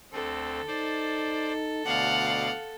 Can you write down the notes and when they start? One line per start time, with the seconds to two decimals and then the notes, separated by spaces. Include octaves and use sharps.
0.12 D2 C4 A4
0.67 D#4 C5 D5
1.86 D2 B2 D5 F5 F#5